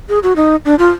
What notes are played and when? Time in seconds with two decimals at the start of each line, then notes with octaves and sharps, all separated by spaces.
0.09 G#4
0.23 F#4
0.36 D#4
0.65 D4
0.79 F4